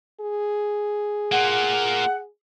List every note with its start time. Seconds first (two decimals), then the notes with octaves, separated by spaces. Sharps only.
0.21 G#4
1.32 A#3 F4 F#5